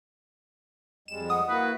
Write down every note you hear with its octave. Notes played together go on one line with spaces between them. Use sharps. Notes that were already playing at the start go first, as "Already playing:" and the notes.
F2 G3 G#3 E7
F#5 D#6
A#3 E4 F#4 B4